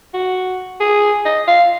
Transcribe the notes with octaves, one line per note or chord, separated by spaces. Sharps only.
F#4
G#4
D#5
F5